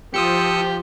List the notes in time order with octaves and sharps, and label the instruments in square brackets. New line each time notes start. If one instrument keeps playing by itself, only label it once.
[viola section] F3 [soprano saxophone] G4 [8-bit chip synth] D#6 E6 C#7